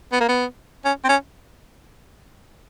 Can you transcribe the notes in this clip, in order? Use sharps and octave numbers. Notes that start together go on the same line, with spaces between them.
B3
A#3
B3
C#4
C4
C#4